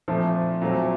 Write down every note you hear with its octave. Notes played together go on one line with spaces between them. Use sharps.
A#2 F3 A3 C4
A#2 F#3 A3 C4